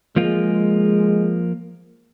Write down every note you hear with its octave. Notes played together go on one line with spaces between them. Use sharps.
F3 G#3 A#3 F4